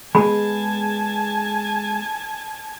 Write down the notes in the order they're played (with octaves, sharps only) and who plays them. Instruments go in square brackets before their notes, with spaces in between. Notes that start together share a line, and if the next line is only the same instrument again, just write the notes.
[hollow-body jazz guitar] G#3 B3 G#4 [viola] G#5 A5 [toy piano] B5